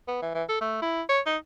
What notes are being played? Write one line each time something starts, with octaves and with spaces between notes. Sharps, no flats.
B3
E3
E3
A4
A3
E4
C#5
D#4